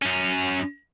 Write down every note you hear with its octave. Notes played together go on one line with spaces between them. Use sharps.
F#2 C#4